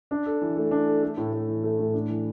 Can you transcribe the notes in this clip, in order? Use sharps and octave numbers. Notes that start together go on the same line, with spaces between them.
D4
A4
E3
A3
D4
A4
A3
A2
A2
E3
A3
A2
D4
E3